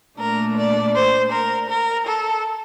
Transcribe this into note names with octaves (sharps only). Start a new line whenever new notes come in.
A#2 A3 D4 A#4
D5
C5
A#4
A#4
A4